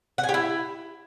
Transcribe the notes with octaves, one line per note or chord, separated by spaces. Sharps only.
F#5
G#5
G4
E4